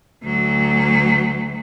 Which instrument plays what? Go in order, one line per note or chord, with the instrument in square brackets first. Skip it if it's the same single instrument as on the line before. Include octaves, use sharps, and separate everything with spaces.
[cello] D2 F#3